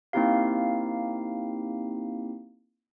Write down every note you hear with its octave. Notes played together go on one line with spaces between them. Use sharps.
A#3 C4 D#4 E4 G4 F5